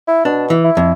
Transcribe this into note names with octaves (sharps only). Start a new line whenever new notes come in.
E4
B2 D4
E3
E4
F2